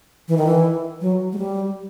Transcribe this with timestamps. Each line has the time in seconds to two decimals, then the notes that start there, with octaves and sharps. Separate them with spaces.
0.28 E3
0.37 D#3
0.46 E3
1.01 F#3
1.33 G#3
1.38 G3